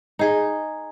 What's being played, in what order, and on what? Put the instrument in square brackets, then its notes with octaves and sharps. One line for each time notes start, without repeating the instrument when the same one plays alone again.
[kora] D#4 G#4